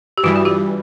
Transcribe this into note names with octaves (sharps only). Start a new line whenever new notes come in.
G4
G2 E3 G3 E4 F#4
F#4
F4 G4